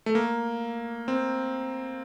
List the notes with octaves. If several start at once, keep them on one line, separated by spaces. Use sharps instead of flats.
A3
A#3
C4